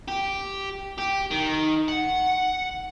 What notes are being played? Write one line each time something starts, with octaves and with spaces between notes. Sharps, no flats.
G4
G4
D#3
F#5